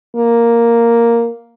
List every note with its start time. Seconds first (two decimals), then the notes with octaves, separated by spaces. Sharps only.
0.16 A#3